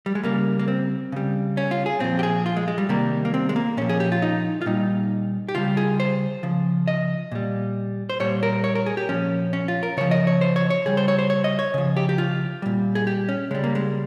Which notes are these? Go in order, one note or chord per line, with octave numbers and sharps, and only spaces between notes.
G3
G#3
C#3 G3 A#3
A#3
C4
C#3 G3
C#4
F4
G#4
A#2 F3 C4
G4
G#4
F4
G#3
G#3
G3
C3 D#3 G3 A#3
A#3
C4
G#3
A#3
A#2 F3 C#4
G#4
G4
F4
D#4
F4
A#2 G3 D#4
G4
C#3 G3 F4
G#4
C5
C#3 F3
D#5
A#2 G3
C5
A#2 G3 C#5
A#4
C#5
A#4
G#4
G4
A#2 F3 C#4
C#4
F4
A#4
C#3 F3 C#5
D#5
C#5
C5
C#5
C#5
C#3 G3 G#4
C5
C#5
C5
C#5
D#5
C#5
C#3 F3
G4
G4
F4
A#2 G3
G#4
G4
C#4
C#3 G3 G#3
A#3
G#3